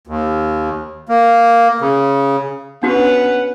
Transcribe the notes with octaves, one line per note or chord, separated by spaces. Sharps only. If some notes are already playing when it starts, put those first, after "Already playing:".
D#2
A#3
C#3
B3 C#4 D4 F#4 G4 B4 F#5